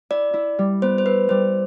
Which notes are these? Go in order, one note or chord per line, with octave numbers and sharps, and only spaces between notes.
E4 D5
E4
G3
B3 C5
C5
E4 B4
G3 C5